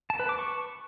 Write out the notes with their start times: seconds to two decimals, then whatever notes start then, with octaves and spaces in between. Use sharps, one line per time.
0.10 A5
0.20 B4
0.29 D6
0.39 C#6